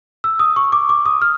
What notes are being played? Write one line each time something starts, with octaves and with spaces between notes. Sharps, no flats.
E6
D#6
C#6
D6
D6
D#6
F6